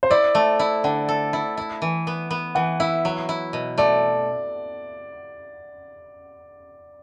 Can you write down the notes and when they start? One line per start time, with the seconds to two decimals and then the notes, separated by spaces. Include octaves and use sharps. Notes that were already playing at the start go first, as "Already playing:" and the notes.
0.03 C5
0.10 E4 D5
0.35 A3
0.59 E4
0.84 D3 F#5
1.09 A4
1.33 E4
1.57 E4
1.82 E3
2.07 B3
2.31 B3
2.55 E3 F#5
2.80 E4 E5
3.05 F#3
3.29 E4
3.53 B2
3.78 A3 D5